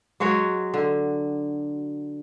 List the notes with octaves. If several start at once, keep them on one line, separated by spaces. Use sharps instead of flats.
F#3 G#3 F#4 C#5
D3